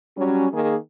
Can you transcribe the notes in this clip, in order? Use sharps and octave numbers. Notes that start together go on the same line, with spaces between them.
F#3 G3 C#4
D#3 A#3 G#4